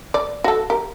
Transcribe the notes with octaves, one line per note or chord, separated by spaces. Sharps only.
D5
F#4 A4
G4 A#4